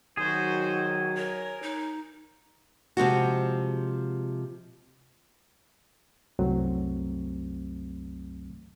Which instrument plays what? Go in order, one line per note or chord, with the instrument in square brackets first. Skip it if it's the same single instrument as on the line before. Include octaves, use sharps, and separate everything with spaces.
[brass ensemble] D#3 F#3 [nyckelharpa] F#4 C5 [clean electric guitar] G#4
[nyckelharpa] A#4 [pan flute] C#5
[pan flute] D#4
[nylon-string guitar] C3 F3 G#3 F#4
[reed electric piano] C2 F#2 F#3 A3 C4